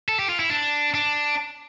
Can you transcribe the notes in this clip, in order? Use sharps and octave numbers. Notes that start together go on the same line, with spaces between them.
A4
G4
F4
E4
D4
D4